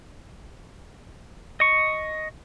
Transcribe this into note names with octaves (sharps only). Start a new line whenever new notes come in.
D#5 C#6